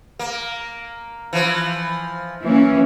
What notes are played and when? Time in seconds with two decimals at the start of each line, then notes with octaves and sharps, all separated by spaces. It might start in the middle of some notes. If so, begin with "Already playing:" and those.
0.19 A#3
1.33 E3 F3
2.42 E3 A#3 C#4